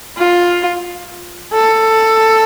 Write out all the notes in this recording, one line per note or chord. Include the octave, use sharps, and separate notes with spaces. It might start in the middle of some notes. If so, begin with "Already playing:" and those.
F4
A4